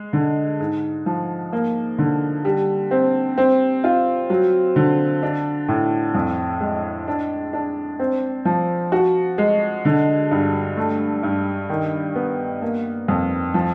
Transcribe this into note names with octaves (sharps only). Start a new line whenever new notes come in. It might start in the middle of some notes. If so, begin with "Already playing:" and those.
Already playing: G#3
D3
G#2
F3
A#3
D3
G3
C4
C4
F4
F#3
D3
D4
A2
F2
G#3
D4
D4
C4
F3
F#4
G#3
D3
G2
A3
G2
D#3
B3
A#3
F2
F3